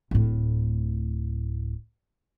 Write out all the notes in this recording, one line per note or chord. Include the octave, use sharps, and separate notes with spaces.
D1 A2